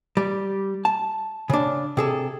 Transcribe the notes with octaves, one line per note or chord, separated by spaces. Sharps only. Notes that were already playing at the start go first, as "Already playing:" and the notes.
G3
A5
C#3 D4
C3 G#4 A4